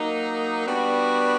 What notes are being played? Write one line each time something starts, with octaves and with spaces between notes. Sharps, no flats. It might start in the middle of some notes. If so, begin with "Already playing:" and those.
Already playing: F#3 A#3 D#4
G3 B3 D4 F#4